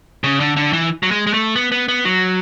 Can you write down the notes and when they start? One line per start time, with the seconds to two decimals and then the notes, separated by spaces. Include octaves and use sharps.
0.24 C#3
0.40 D3
0.57 D3
0.73 E3
1.03 F#3
1.11 G#3
1.27 G#3
1.34 A3
1.56 B3
1.72 B3
1.88 B3
2.05 F#3